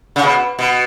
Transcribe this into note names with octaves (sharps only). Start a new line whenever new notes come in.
C#3
B2
B2